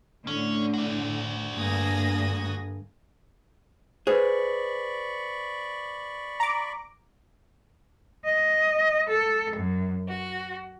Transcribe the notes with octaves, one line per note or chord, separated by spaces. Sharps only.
A2 D3 C#4
F#4 D5
G2 D3 A#3 G#5 D#6 A#6
G#4 B4 C5 D5 B5 C#6
A#5 D6
D#5
A4
F#2
F#4